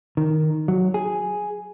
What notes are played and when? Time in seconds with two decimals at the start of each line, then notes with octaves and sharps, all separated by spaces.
0.17 D#3
0.68 F#3
0.94 G#4